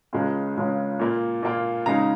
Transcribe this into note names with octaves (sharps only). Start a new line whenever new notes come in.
C#2 C#3 G#3 C#4 F4
C#2 C#3 G#3 C#4 F4
A#2 A#3 F4
A#2 A#3 F4
C#3 G#3 D#4 F5 A#5